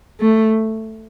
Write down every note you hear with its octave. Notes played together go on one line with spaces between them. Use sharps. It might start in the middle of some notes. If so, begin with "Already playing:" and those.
A3